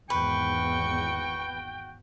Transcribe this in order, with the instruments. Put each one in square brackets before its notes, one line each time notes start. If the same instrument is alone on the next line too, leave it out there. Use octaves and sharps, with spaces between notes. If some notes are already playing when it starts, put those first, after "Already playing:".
[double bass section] G#1 E2 G#2 [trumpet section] F#4 G5 [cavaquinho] B4 [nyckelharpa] C#6